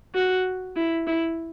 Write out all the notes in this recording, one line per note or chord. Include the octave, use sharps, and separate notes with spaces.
F#4
E4
E4